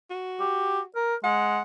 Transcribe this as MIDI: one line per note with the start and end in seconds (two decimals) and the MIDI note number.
0.10 0.85 66
0.40 0.80 67
0.95 1.16 70
1.24 1.60 56
1.24 1.62 78